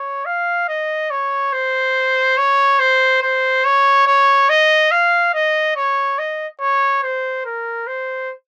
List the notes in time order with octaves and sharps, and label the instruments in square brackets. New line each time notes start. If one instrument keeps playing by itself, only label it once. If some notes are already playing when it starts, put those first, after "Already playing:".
Already playing: [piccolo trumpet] C#5
F5
D#5
C#5
C5
C#5
C5
C5
C#5
C#5
D#5
F5
D#5
C#5
D#5
C#5
C5
A#4
C5